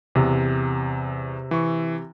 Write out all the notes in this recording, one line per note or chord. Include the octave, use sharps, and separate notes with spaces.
E2 C3
E3 C#6